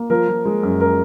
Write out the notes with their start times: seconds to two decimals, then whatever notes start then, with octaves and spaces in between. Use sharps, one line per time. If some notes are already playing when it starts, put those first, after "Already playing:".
Already playing: A#3
0.10 F3 A#4
0.28 F3
0.45 G#3
0.63 F#2
0.80 A#4